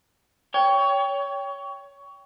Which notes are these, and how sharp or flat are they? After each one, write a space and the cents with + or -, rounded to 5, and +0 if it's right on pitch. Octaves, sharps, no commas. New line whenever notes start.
C#5 +20 G5 +5